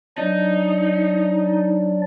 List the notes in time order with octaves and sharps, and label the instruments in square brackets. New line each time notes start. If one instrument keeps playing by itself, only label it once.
[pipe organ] F#3 D4 D5 [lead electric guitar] D#4